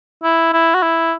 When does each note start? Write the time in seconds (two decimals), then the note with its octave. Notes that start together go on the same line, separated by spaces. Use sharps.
0.23 E4
0.53 E4
0.75 F#4
0.83 E4